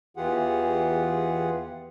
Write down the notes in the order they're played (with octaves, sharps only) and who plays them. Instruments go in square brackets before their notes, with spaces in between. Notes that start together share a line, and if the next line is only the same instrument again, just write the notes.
[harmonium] E2 E3 F4 G4 G#4 F#5